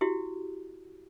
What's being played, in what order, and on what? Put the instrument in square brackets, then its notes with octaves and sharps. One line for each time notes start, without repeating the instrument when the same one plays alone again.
[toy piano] E4 F#4 G4